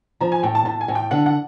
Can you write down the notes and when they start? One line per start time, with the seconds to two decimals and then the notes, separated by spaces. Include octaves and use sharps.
0.21 F3 A#5
0.32 G#5
0.43 A2 G5
0.55 A5
0.65 A2 A5
0.81 G#5
0.88 A2
0.95 G5
1.11 D3 F#5
1.26 F#5